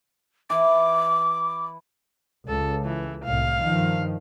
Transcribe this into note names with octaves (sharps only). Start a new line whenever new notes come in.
E3 D6
C#2 A4
E3
C2 A2 F5
G2 D#3 F3